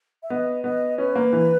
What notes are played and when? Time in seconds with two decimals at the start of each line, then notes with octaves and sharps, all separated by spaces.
0.23 E5
0.30 B3 D#5
0.64 B3 D#5
0.98 C#4 B4
1.16 A#3
1.33 E3